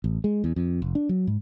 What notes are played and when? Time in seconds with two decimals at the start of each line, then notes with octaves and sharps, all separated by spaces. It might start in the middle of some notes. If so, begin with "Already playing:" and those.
0.04 A1
0.24 G#3
0.44 E2
0.56 F2
0.82 F1
0.95 D4
1.09 F#3
1.27 G#2